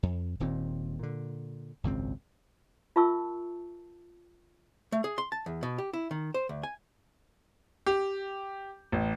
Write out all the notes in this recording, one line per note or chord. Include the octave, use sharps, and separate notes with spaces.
F2
D#1 D#2 A#2 C4
A#2 D3
G#1 C#2 F#2 C4
F4 A#4 E5 A5 C#6 E6
A3
G#4
C6
A5
E2
B2
G4
E4
D#3
C5
D2
G#5
G4
A1